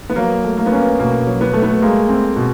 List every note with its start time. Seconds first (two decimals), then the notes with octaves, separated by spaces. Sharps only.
0.10 B3
0.16 F#3 A#3
0.44 A3
0.58 A#3
0.66 B3
0.72 A#3 C#4
0.99 B2 A#3
1.27 F#3
1.41 B3
1.53 A3
1.62 B3
1.82 G#3 A#3
2.09 C4
2.36 B2